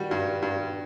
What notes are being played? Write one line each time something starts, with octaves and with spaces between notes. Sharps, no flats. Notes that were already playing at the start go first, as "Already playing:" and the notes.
Already playing: G3 F#4
G2
G2